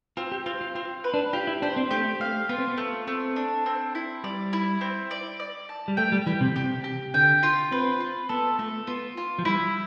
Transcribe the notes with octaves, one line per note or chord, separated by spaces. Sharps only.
C4 F4
G4
C4 F4
F4
C4 F4
B4
D4
F4 G4
E4
D4 C5
C4
A3 G4
A3 F5
B3 F4
C4
B3
A3
A3 C4
D4
C4
E4
G3 D5
E4
C4
D5
D5
A5
G3
A3 G5
G3
E3 G4
C3
C3 G4
G4
D3 G5
F4
C4 B4
F4
B3 A4
A3 A4
B3 F4
F4
F3
G3 E4